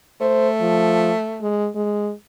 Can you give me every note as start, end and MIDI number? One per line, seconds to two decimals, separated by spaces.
0.21 1.53 57
0.21 0.49 72
0.61 1.11 53
1.42 1.69 56
1.75 2.11 56